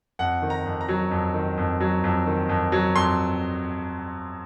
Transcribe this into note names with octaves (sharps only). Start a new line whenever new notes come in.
F2 F#5
D#3
A#5
F2
A#5
F#3
F2
D#3
F2
F#3
F2
D#3
F2
F#3
F2 C6